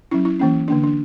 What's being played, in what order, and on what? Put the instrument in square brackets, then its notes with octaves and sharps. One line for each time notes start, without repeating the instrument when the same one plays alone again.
[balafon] F#3 C#4 E4
E4
E3 A#3 C#4
D3 A#3 D4
D4